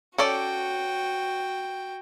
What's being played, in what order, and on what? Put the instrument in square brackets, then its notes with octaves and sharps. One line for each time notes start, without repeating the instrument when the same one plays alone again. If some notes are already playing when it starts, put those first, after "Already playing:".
[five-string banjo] C#4 A4 D5 [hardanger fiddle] F#4 G5